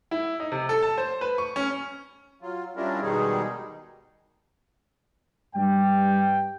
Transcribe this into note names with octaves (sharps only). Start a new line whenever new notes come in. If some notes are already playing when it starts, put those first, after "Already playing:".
E4
D#4
C3
A4
A5
C5
B4
C#6
C#4
F#3 F4
G3 C#4 D4 E4 F4 A#4
B2 D#3 G3 G#3 D#4 G#4
G2 G3 G5